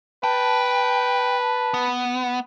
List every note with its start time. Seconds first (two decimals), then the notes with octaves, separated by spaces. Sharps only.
0.24 B4 G5 A5
1.74 B3